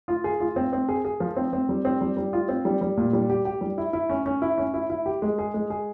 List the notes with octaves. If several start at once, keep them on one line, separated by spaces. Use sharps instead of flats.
F4
G#4
F4
C4
C4
G#4
G#4
F3
C4
C4
G3
C4
G3
G3
F4
C4
G3
G3
A#2
G3
G4
G4
G3
E4
E4
C#4
C#4
E4
C#4
E4
E4
G4
G#3
G#4
G#3
G#4